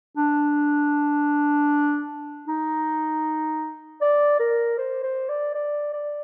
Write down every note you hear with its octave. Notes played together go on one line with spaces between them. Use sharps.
D4
D#4
D5
A#4
C5
C5
D5
D5
D5